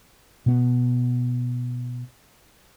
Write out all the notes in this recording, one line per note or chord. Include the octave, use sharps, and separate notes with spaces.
B2 B3